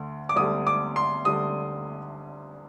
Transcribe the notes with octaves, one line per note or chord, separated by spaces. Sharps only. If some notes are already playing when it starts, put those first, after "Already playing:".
Already playing: D2 D3
D6
D2 D3 G3 D#6
D6
C6
D2 D3 G3 D#6